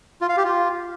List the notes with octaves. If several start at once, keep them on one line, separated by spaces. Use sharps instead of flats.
F4
F5
G4
F4